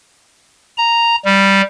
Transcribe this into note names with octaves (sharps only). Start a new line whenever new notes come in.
A#5
G3